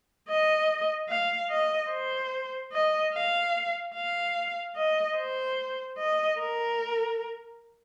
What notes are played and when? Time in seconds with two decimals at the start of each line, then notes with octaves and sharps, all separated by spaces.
0.28 D#5
1.09 F5
1.50 D#5
1.91 C5
2.73 D#5
3.13 F5
3.95 F5
4.76 D#5
5.17 C5
5.98 D#5
6.39 A#4